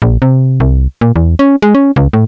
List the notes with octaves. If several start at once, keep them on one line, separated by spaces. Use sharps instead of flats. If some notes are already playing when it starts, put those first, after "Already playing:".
A#1
C3
C2
A#2
E2
C#4
G#3
C#4
C#2
A2